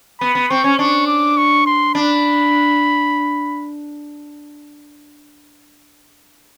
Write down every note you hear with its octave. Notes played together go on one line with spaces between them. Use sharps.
B3 B5
B3
C4 C#6
C#4
D4 C#6
D6
C#6
C6
D4 B5